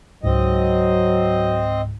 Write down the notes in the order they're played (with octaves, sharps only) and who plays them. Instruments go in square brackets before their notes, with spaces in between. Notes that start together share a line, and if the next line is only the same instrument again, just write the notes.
[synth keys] C#2 G#2 [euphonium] F#3 [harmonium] C4 D#5